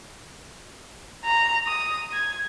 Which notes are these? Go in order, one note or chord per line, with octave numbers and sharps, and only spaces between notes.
A#5
D#6
G#6